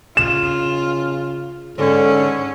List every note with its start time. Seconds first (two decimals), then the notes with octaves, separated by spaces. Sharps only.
0.17 C#3 F4 E7
1.78 G#2 D3 C#4